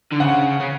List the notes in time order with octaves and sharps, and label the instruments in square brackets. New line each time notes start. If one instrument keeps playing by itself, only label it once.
[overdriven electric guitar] D3
[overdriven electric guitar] C#3 [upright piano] F#5
[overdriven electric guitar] C#3